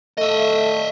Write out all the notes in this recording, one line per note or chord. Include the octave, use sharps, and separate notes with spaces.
A3 D#5 E5